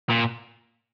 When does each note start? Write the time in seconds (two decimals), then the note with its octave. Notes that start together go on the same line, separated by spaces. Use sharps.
0.09 A#2